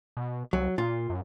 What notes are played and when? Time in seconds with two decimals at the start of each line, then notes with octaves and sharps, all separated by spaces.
0.17 B2
0.53 C2 F#3
0.78 A#2 F4
1.10 F#2